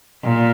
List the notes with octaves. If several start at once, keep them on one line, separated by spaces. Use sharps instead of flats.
A#2